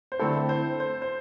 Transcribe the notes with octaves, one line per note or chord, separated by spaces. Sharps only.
C5
D3 A3 C4 E4 A4
C5
C5
C5